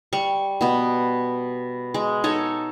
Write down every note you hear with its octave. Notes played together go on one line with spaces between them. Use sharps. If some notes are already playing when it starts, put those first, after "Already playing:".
G3 C#6
B2 B3
G#3
D#4 A4 C#5